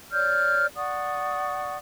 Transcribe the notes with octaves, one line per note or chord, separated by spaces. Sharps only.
C#5 D5 F6 G6
D5 F#5 C#6 D#6